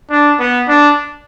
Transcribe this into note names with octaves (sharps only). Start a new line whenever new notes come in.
D4
B3
D4